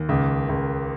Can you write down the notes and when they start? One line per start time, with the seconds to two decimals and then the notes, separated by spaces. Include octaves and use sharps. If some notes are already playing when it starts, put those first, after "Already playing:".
Already playing: D#2
0.09 C#2
0.49 C#2